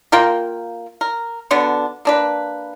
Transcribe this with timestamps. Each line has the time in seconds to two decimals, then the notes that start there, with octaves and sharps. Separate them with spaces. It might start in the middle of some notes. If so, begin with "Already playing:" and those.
0.12 A#3 F4 A#4 G5
1.01 A#4
1.51 B2 D3 B3 D4
2.05 A#3 D4 B4